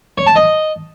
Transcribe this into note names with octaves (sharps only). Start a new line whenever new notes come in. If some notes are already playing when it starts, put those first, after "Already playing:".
C#5
A5
D#5